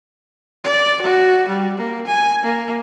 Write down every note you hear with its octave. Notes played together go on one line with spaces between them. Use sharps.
D5
F#4
G3
A#3
G#5
A#3